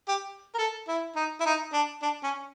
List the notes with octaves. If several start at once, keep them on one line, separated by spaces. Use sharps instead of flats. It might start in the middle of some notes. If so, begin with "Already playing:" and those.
G4
A#4
A4
E4
D#4
E4
D#4
D4
D4
C#4